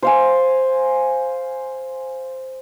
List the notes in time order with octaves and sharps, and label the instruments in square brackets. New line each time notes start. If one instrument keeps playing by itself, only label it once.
[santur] C5 F5 G#5